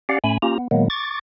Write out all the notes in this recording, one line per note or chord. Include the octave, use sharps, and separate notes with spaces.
C#4 G4 D5 F5 F#5
A2 A3 C#4 G#5 B5
A#3 C#4 F4 G4 A#5
B3
A#2 D#3 F#3 G#3 A#3 B3
C#6 D6 A6